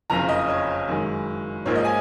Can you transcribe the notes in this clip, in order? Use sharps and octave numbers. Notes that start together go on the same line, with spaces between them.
F#1 F2 C#3 A#5
D#5
C#5
F#2 D#3 G#3
A#1 G#2 F3 A#3 C#5
D#5
G#5